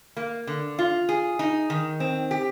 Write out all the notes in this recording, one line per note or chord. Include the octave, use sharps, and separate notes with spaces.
A#3
D3
F4
G#4
D#4
D#3
C4
G4